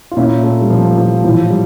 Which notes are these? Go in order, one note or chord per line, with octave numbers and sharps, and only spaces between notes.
F4
A#2 C#4 E4
A3 C#4
G3
A#2 F3
F3
A2 E3 F3
G3